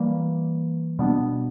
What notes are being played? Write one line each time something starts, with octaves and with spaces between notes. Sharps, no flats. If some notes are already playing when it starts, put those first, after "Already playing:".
Already playing: E3 G3 A#3
B2 G3 B3 D4